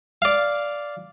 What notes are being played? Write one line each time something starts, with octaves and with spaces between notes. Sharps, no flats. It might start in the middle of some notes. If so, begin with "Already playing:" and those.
D5 F5